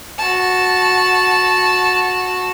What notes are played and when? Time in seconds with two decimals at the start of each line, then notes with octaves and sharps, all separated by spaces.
0.18 F#4 A5